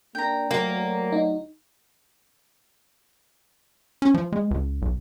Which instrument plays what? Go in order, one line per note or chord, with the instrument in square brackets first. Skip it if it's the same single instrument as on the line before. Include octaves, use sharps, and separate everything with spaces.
[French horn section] A#3 D4 [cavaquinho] G5 A#5
[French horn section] D2 F#3 [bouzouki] A#3
[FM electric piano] D#4
[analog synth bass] C#4
F3
G#3
C#2
B1